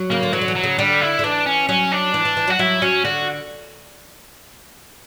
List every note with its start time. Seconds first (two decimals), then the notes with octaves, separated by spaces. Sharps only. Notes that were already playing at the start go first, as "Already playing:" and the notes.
Already playing: F#3
0.10 C#3 A#3
0.23 D3
0.33 E3 F#3
0.41 D3
0.48 E3
0.56 F#3
0.63 C#3
0.78 D3 G3
1.01 E4
1.19 D3
1.24 E3 D4
1.46 C#4
1.69 F#3 C#4
1.92 D4
2.14 E3
2.25 E3
2.37 E3
2.48 F#3 F#4
2.59 F#3 E4
2.82 F#3 C#4
3.05 D3 F#4